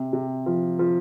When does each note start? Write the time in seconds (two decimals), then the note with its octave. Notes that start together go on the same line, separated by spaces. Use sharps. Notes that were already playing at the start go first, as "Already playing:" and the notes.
Already playing: C3
0.13 C3
0.46 F3
0.79 F3